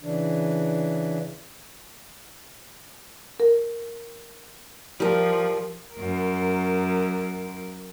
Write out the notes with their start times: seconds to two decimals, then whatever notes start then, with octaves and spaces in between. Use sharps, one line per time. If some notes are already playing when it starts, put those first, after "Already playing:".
0.02 C#3 E3 D4
3.40 A#4
5.00 F3 G3 A#4
5.94 F#2 A#4